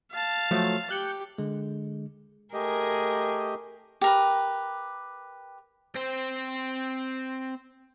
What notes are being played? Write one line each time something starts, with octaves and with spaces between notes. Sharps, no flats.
F5 A5
F3 F#3 A3
G4 F#6 G6 C#7
D3 G#3
A3 G4 G#4 A#4 D#5
G4 A#4 B4
C4 C5